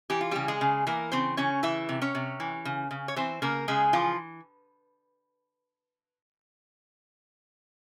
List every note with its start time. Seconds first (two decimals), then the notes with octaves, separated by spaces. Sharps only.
0.10 E3 G4
0.21 F4
0.31 C#3 G3 G4
0.48 G#3 G#4
0.61 C#3
0.87 E3 A#3 A#4
1.12 C#3 C4 C5
1.37 C#3 C#4 C#5
1.63 E3 E4 E5
1.89 C3
2.02 C#4 C#5
2.15 C3
2.40 E3
2.65 C#3
2.91 C#3
3.08 C#5
3.16 E3 C4 C5
3.42 C#3 A#3 A#4
3.68 C#3 G#3 G#4
3.93 E3 F3 F4